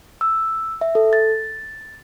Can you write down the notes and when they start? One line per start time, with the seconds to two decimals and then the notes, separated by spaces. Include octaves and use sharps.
0.21 E6
0.81 E5
0.95 A4
1.13 A6